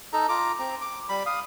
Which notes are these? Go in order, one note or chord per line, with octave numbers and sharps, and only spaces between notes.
D#4 A4 A#5
F4 A#5 D6
C4 A#5
D6
G3 B5
F5 D#6